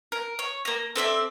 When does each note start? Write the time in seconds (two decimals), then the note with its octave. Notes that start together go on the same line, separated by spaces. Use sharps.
0.12 A#4
0.39 C#5
0.65 A#3 A#5
0.96 C4 A4 D5 E5